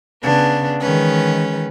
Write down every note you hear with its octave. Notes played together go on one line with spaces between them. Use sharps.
C#3 B3 D4
D#3 E3 G#3 C#4 B4